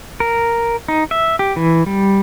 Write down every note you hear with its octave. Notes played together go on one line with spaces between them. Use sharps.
A#4
D#4
E5
G4
E3
G3